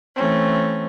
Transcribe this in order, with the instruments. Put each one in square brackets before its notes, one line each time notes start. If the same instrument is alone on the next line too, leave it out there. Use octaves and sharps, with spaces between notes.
[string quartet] E3 A3 C4 C#4